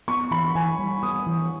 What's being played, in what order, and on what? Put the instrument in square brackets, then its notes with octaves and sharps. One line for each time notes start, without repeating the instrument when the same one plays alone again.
[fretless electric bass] B3 [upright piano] C#6
[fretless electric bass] E3 [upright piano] B5
[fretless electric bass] E3 [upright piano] G#5
[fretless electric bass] G3
[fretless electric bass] B3 [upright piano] D#6
[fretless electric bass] E3